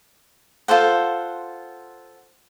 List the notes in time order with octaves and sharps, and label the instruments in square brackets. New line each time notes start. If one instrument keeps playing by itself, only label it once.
[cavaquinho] F4 A4 C5 F#5